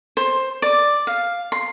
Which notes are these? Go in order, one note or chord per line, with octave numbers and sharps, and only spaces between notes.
C5
D5
F5
C6